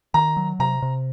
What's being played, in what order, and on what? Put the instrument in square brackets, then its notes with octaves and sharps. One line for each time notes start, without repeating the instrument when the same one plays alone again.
[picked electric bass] D#3 [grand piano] A#5
[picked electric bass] F#3
[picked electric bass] C3 [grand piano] A#5
[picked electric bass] C3